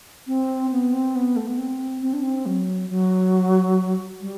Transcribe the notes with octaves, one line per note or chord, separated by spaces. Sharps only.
C4
B3
C4
B3
A3
B3
C4
C4
D4
C4
F#3
F#3
G3